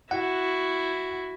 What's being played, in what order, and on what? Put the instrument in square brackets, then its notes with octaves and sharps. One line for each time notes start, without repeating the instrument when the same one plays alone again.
[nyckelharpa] E4 F#4 [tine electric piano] F#5